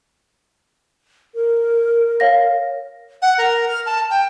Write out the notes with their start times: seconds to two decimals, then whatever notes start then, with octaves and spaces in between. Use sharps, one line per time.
1.35 A#4
2.20 C#5 F5 A#6
3.22 F#5
3.38 A#4
3.68 F6
3.86 A5
4.10 G5